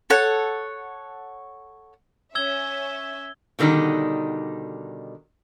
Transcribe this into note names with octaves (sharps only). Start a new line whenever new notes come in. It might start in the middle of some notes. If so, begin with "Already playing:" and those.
A4 C#5 F#5
C#4 E5 E6 G#6 G7
B2 D3 D#3 G3 D#4